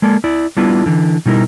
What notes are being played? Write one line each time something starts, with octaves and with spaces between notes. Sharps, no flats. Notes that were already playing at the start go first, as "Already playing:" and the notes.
G#3 A#3 A4 D5
E4 D5
G3 B3 D4 E4 F4
D3 E3
B2 G3 D#4 E4 A#4